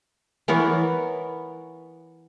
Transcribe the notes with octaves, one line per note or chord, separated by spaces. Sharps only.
E3 B3 A#4 C#5